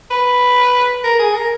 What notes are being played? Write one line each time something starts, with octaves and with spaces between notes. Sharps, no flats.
B4
A#4
G#4
A#4